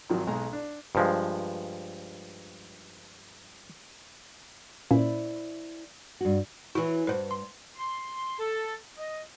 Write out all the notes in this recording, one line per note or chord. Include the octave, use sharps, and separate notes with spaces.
G#1 D#3 F3 F#3
B1 G#3 A#5
D4
G2 F3 G#3
A#2 A#3 C#4 E4 C5 D5
G2 F#4
E3 F#3 E4 F#4
G2 F#4 B4 C5
C6
C6
A4
D#5